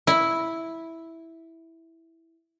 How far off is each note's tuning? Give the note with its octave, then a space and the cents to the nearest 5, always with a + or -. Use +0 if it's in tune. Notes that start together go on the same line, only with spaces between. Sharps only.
E4 -5